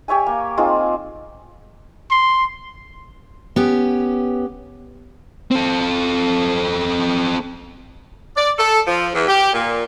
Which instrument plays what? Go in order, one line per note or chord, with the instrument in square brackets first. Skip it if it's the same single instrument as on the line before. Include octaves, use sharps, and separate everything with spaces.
[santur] G4 C#5 E5 G#5
A#3
C4 D#4 F4 G#4
[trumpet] C6
[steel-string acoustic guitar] B3 C#4 G4
[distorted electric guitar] C4 A4
[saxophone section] D5
A4
F3
E2
G4
A#2